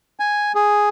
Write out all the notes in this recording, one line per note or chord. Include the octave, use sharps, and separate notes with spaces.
G#5
G#4